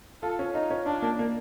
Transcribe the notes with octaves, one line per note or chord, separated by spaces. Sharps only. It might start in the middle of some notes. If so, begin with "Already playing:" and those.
F4 A4
C#4
D#4 F4
C#4
D4 F4
A#3
A#3